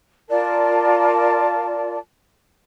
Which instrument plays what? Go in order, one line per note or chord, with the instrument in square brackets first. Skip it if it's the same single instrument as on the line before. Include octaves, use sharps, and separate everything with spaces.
[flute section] F4 A#4 D5 A5